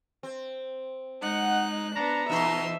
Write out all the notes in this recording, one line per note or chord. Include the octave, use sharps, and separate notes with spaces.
C4
G#3 D#4 F#5 F#6
B3 D4 A#5
E2 B2 D#4 E5 C6